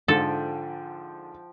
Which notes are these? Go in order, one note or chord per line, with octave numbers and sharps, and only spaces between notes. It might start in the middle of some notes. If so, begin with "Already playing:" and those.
G#2 D3 F3 A4 G5